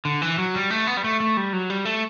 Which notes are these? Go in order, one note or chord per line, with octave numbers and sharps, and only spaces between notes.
D3
E3
F#3
G3
A3
B3
G3
A3
A3
G3
F#3
G3
A3